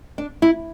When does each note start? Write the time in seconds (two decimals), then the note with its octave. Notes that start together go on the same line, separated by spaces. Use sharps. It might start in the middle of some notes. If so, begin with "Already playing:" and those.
0.18 D4
0.42 E4